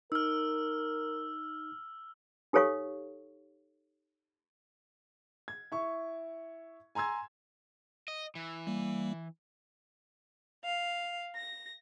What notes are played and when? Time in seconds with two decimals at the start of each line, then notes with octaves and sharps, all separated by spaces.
0.12 D#4 A#4 E6 F6
2.53 D#4 G4 A4 C#5 F5 C#6
5.48 G#6
5.72 E4 C#6
6.95 G#5 A#5 C6 E6 G#6
8.08 D#5
8.35 E3
8.67 G3 A#3
10.64 F5
11.37 A#6